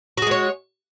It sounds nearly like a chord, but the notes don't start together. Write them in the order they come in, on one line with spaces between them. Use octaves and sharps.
F#4 G#4 G#3 C#5